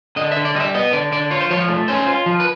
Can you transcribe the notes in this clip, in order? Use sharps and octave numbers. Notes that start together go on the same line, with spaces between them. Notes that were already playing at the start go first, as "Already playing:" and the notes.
D3 D#5
E5
D3
D5
G3 D#5
E5
B3 D#5
D3 D5
D3 D5
F4 C#5
C5
F3 C#5
A3
C#4 C5
F4
F3
B4